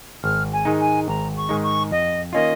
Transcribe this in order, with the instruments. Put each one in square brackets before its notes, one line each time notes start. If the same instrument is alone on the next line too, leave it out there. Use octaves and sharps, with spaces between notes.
[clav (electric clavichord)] G#1 [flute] F6
[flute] G#5
[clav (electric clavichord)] G#2 D#3 G#3 D#4
[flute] G#5
[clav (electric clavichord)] G#1 [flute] A#5
[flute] C#6
[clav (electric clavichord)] G#2 D#3 G#3 D#4
[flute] C#6
[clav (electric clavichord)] F2 [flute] D#5
[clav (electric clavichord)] D#3 A#3 C#4 F4 [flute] D#5